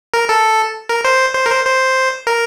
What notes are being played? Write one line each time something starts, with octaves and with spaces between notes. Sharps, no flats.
A#4
A4
A#4
C5
C5
A#4
C5
C5
A#4